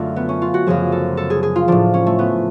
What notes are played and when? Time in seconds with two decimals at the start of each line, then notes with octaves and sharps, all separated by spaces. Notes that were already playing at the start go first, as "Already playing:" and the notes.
Already playing: F#2 D3 A3 D4 F4
0.16 B3
0.29 C#4
0.42 F4
0.54 F#4
0.67 F#2 C#3 F3 G#4
0.92 A4
1.17 A4
1.30 G#4
1.43 G#4
1.56 F4
1.68 A2 F3 D4
1.94 C#4
2.06 A3
2.19 B3